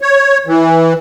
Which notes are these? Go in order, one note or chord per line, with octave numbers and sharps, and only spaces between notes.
C#5
E3